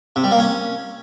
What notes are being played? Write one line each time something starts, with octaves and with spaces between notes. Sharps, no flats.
C3
G3
A#3
C#4